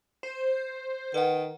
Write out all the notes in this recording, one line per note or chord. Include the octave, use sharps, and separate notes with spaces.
C5
D#3 B4 F#5